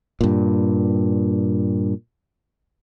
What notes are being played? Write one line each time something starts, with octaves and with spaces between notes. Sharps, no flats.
G2 A#2